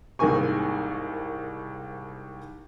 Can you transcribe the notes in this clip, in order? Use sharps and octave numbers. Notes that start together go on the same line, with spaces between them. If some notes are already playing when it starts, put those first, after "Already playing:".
C2 G#2 D#3 A#3 G#5 C#6